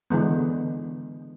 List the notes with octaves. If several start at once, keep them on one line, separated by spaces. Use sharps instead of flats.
D3 E3 G#3 B3